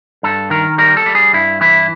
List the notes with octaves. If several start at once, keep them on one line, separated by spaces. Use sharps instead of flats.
G2 A4
D#3 A#4
G3 A#4
A4
G3
G#4
G2 E4
E3 E4